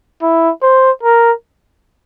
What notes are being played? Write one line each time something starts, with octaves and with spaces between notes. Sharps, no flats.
E4
C5
A#4